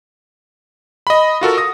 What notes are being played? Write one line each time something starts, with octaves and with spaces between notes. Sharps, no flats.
D#5 B5
F4 F#4 A4 A#4
D#6 A#6